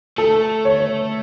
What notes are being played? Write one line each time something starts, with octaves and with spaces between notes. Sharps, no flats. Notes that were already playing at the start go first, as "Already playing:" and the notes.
A3 A4
C#5